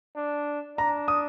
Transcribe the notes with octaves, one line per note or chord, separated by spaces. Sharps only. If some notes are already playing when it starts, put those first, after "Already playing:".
D4
D4 A#5
D#6